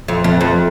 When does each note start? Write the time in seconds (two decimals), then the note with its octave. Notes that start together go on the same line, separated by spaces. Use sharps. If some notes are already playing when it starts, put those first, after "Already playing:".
0.08 F2
0.24 F2
0.41 F2